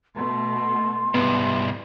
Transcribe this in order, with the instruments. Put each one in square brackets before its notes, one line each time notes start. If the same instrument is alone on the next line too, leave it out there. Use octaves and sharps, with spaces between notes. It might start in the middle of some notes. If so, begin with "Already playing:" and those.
[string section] B2 A3 [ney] C6
[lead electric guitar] C2 G#2 [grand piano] B3